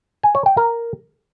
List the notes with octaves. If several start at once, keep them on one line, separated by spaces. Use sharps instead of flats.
G#5
C#5
G5
A#4